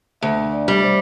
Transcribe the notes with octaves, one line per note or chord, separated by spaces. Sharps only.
D2 E5
D5
G3
C5